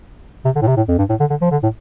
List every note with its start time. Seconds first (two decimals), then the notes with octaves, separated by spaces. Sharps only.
0.45 C3
0.56 D3
0.62 A2
0.68 C3
0.77 A2
0.89 F2
0.99 G2
1.10 A2
1.20 D3
1.30 D3
1.42 F3
1.52 D3
1.63 A2